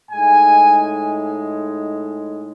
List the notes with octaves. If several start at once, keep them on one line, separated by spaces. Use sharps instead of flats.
A2 G#3 D#4 G#5